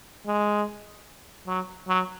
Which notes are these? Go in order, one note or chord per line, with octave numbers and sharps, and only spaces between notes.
G#3
F#3
F#3